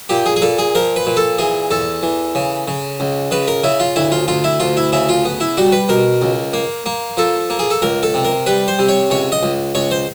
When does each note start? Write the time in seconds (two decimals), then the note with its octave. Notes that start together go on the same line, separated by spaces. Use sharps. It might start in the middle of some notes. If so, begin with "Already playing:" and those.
0.09 A#2 G4
0.26 G#4
0.36 G#4
0.42 A#2 A4
0.58 G#4
0.75 F3 A#4
0.96 B4
1.06 A#2
1.17 A4
1.38 E3 G#4
1.71 E2 A4
2.03 E3
2.35 C#3
2.68 C#3
3.00 C#2
3.31 C#3 B4
3.48 A#4
3.63 C#3 E4
3.80 F4
3.96 D2 E4
4.12 F4
4.28 D2 F4
4.44 E4
4.60 D2 F4
4.77 E4
4.92 C#3 E4
5.09 F4
5.25 B3
5.40 E4
5.57 G3 F#4
5.72 B4
5.89 B2 A#4
6.22 C#2
6.53 A#3
6.86 A#3
7.17 F3 A4
7.50 A#3
7.59 G#4
7.71 A4
7.82 C#2 A#4
8.03 A4
8.14 C3
8.25 A#4
8.46 G3 B4
8.68 C5
8.79 C3
8.89 C#5
9.10 C#2 C#5
9.32 D#5
9.43 C#2
9.75 C#2 C#5
9.91 C5